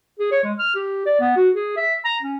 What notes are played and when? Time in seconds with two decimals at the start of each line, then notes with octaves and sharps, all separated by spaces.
0.19 G#4
0.31 C#5
0.44 G#3
0.59 F6
0.75 G4
1.06 D5
1.20 B3
1.36 F#4
1.54 G#4
1.77 E5
2.05 A#5
2.22 C#4